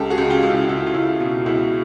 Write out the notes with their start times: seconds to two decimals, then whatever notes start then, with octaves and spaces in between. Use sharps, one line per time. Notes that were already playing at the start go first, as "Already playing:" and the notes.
Already playing: C#2 G4 A4
0.10 F#4 G#4
0.18 C#2
0.30 F4 G4
0.43 C#2
0.49 E4 F#4
0.68 C#2 E4 F#4
0.86 F4
0.94 C#2 E4
1.20 B2 F4
1.46 C#2 E4 F#4